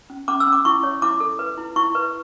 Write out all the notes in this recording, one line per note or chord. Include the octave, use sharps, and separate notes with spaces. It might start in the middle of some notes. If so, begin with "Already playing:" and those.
C#4
C#4 D6
E6
C#4
D6
E4 C#6
C#5
E4 D6
A4
B4
E4
E4 C#6
B4